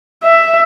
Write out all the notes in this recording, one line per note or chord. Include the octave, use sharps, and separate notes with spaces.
E5